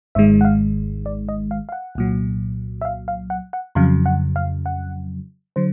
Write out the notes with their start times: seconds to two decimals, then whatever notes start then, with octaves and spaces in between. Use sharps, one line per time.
0.15 G#1 G#2 D#3 G#3 E5
0.41 F#5
0.45 F5
1.06 D5
1.29 D#5
1.51 F5
1.69 F5
1.72 F#5
1.95 C2 A#2 F#3
2.81 E5
2.85 F5
3.08 F5
3.30 F#5
3.53 F#5
3.75 F2 C#3 F#3 F5
4.06 F#5
4.36 F5
4.66 F#5
5.56 D3 F#3 C5